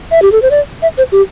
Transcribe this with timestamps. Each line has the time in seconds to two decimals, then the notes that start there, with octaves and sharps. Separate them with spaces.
0.11 E5
0.22 G4
0.32 A4
0.42 C5
0.51 D5
0.82 E5
0.98 C5
1.12 G4